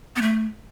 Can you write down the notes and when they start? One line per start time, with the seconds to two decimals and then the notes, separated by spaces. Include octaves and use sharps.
0.16 B3
0.22 A3